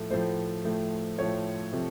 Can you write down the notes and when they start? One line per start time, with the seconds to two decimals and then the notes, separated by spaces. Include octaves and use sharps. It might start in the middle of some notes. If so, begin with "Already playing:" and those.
Already playing: A2 F3 A3
0.10 A2 F3 A3 C5
0.64 A2 F3 A3
1.18 A2 F3 A3 C#5
1.72 C3 F3 A3